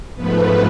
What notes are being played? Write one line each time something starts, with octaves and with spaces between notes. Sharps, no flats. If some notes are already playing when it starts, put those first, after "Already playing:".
G#2 F3 A3 B3 B4